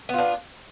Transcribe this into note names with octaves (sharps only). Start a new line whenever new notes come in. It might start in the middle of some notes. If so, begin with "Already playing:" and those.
B3 D4 F4